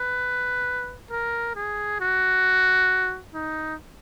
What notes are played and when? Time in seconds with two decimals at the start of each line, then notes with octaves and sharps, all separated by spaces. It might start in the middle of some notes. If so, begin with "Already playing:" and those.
Already playing: B4
1.10 A#4
1.55 G#4
2.00 F#4
3.34 D#4